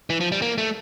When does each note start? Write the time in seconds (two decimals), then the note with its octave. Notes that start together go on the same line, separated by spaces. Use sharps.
0.10 E3
0.20 F3
0.32 G3
0.42 A#3
0.58 A3